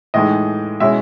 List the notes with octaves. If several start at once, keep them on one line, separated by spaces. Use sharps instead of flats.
A2 E3 G#3 D#4 D#5
B2 G#3 C#4 E4 E5